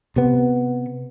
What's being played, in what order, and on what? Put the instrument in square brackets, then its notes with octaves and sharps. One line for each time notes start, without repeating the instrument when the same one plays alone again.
[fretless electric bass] C3 B3